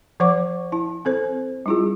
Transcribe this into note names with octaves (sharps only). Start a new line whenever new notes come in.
F3 C5 F#5 C#6 D6
E4 A5
C4 A4 C5
G3 D4 E4 F4 G#4